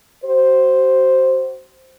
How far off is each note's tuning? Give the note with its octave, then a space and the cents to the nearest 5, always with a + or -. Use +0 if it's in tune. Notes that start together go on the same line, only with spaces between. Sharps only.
F#4 +35 C5 +0